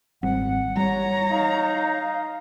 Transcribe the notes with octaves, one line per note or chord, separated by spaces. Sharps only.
G#1 G3 C4 F#5
G3 C#5 A#5
D#4 F5